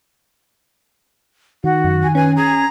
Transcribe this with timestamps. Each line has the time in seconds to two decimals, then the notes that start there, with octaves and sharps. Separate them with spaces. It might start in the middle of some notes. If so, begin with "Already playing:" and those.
1.64 D#3 F#4 F#5
1.85 F#2
2.03 G#5
2.15 C#4 B4 G#5
2.36 G#4 A#5